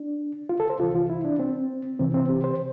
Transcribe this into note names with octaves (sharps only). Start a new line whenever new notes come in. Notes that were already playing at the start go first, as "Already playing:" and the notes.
Already playing: D4
F4
A4
C5
C2 C3 E3 F4
F4
E4
D4
C4
C2 C3 E3 C4
C4
G4
C5